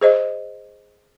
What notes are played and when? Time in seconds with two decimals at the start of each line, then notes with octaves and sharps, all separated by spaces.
0.01 G#4 C5 D#5